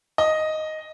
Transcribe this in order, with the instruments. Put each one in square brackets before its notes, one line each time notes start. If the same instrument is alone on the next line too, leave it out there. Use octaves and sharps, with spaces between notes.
[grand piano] D#5